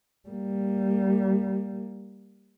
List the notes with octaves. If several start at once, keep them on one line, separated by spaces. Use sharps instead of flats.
G3 A#3